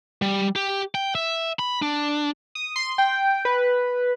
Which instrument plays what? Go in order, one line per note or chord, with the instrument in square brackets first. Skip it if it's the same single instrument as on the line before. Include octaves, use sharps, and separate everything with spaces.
[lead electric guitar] G3
G4
G5
E5
B5
D4
[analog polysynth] D#6
C6
G5
B4